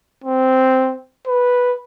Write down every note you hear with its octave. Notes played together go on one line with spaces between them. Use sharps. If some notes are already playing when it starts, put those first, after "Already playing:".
C4
B4